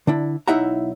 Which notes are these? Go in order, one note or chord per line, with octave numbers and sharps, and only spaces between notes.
D3 D4 E4
B1 D#4 E4 E5 F#5 A#5